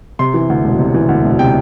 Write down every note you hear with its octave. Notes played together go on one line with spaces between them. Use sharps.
C3 C6
E3
D2
E1
C3
E3
D2
E1
C3 G5